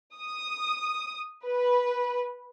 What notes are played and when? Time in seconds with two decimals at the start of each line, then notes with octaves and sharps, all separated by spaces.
0.16 D#6
1.44 B4